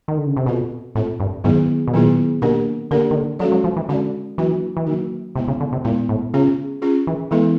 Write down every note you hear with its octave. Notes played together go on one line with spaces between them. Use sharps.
D#3
D3
C#3
C3
B2 C4 F4 A4
A2 C4 F4 A4
G2
G#2 D#3 F#3 B3 E4 G#4
B2
A#2 D#3 F#3 B3 E4 G#4
B2 A#3 D4 G4 A#4
D3 A#3 D4 G4 A#4
D#3
D3
F#3 G#3 C#4 F#4 A4 D5
F#3
F3
E3
D3 G#3 C#4 F#4 A4 D5
E3 F#3 A#3 D4 F#4
E3
D#3 F#3 A#3 D4 F#4
C3 G#3 B3 E4
C#3
D3
C3
A#2 G#3 B3 E4
A2
C#3 C#4 F4 G#4
C#4 F4 G#4
E3
E3 G#3 B3 E4 A4